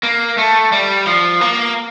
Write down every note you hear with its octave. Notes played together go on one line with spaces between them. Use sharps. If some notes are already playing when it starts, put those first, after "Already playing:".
A#3
A3
G3
F3
A#3